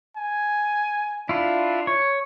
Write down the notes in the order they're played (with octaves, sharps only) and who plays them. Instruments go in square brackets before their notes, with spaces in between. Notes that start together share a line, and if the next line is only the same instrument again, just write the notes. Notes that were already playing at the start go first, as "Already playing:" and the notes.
[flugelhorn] G#5
[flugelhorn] D4 [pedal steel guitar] E4 F4
[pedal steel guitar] C#5